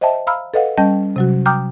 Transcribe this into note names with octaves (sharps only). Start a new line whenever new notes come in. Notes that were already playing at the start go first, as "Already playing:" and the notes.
C5 D#5 E5 G5 A5
F5 A#5 B5 E6 F6
A4 B4 D#5 F5 F#5
G3 C#4 D#5 G5 A5 G6
C3 F#3 F#4
G5 A#5 D6 D#6 F6 G6